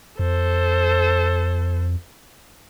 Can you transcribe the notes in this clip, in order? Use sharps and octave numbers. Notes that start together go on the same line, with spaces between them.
F2 A4 C5